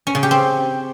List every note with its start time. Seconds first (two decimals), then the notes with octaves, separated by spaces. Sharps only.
0.07 C#4
0.15 C#3
0.23 G4
0.31 C4